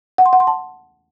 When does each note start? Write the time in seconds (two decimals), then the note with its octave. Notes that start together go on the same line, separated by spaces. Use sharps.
0.18 F#5
0.26 C6
0.33 F#5
0.40 C6
0.47 A5